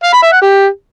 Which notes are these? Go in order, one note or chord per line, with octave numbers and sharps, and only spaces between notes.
F5
B5
E5
F#5
G4